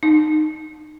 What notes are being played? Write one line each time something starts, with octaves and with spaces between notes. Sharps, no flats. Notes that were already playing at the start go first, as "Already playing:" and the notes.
D#4